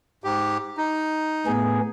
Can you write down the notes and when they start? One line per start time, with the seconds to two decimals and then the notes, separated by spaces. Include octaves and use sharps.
0.24 G#2 G4
0.77 D#4
1.46 A2 B3 G#4